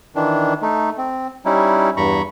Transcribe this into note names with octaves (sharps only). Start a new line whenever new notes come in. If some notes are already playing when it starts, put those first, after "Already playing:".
D#3 E3 D4
A3 D#4
C4
G3 C#4 D#4 E4
E2 G2 A#5 B5 C#6